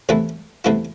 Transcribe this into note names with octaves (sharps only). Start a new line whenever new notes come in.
E2 C3 E3 A3 E4
E2 C3 E3 A3 E4